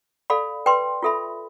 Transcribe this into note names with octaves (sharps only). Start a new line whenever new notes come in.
A4 D5 F5 B5
B4 D5 G5 C6
F4 A4 E5 B5